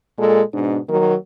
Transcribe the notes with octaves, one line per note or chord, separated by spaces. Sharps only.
A#2 G#3 A4
G#2 B2 D4
D#3 F#3 A#3